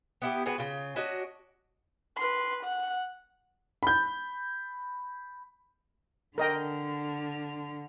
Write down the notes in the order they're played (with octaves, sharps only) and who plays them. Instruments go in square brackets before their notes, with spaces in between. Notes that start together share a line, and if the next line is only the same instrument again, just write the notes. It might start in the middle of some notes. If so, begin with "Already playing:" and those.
[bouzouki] B3 E4 G4
G#3 B3 F#4 B4
C#3 F4
C#4 D4 F#4 D#5
[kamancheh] B4 C6
F#5
[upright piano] B5 G6
[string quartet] D3 F6 [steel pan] A#4 D#5 G5